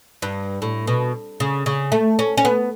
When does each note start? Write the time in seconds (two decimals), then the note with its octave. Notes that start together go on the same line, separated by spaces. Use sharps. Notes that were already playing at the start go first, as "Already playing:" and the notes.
0.22 G2
0.62 A2
0.87 B2
1.40 C#3
1.66 C#3
1.92 A3
2.19 C#4
2.37 C#4
2.45 B3